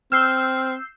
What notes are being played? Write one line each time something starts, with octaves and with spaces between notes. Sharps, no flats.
C4 E6 F6 G6 C7